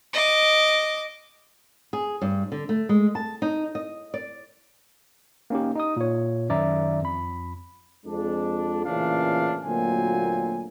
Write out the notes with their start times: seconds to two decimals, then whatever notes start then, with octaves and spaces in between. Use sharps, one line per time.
0.14 D#5 D6
1.93 G#4
2.21 G2
2.52 D3
2.69 A3
2.89 G#3
3.15 A5
3.42 D#4
3.75 D#5
4.14 D5
5.50 A#3 C#4 D#4 G4
5.75 D#4 D#5 D#6
5.96 A#2 C#5
6.49 F#2 D#3 D5 E5 A#5
7.02 F2 B5
8.06 F2 G#3 D4
8.86 A1 A#2 C#3 E3 D4 F5
9.63 D2 A#2 F#3 A#3 C4 G#5